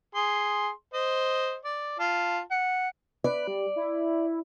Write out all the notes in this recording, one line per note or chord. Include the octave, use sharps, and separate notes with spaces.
G#4 C6
C5 D#5
D5
F4 A5
F#5
B4 D5
G3
E4